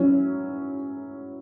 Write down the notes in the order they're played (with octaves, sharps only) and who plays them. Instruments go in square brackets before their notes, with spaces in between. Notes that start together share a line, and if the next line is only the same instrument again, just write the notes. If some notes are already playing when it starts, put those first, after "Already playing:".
Already playing: [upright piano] F#3 C#4 E4